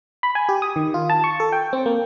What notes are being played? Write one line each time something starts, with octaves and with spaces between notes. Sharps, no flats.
B5
G#5
G4
D#6
D#3
F4
A5
C#6
A4
G5
C4
A#3